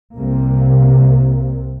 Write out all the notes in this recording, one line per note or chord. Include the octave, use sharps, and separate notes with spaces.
C2 C3 A#3